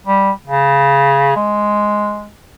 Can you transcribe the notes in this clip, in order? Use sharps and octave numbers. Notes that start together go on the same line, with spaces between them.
G3
C#3
G#3